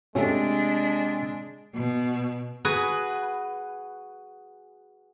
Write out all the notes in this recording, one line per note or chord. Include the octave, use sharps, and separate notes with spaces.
C3 G#3 A3 C#4 D4
B2
F#4 G#4 B4